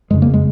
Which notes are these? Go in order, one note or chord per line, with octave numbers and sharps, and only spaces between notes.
F#1 F2 C#3 G#3
A#3
G#3